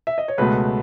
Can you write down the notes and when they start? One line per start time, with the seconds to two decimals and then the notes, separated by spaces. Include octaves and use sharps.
0.07 E5
0.18 D#5
0.28 C#5
0.38 C#2 B2 A3 B4